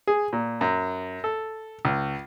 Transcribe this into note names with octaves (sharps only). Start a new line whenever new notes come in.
G#4
A#2
F#2
A4
C#2